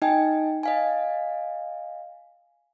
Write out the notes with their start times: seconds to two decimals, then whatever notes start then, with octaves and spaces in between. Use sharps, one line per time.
0.02 D#4 D#5 G5 G#5
0.63 D#5 F5 G#5